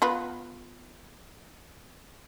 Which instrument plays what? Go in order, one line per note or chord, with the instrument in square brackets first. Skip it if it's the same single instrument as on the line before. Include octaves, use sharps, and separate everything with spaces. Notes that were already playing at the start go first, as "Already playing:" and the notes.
[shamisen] B3 F4 B4